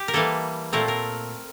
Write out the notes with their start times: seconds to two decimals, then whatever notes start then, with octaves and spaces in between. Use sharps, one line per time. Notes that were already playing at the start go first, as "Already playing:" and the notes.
Already playing: G4
0.08 A#4
0.13 E3 G3 A#3 A4
0.73 A#2 A3 C4 A#4
0.88 A#4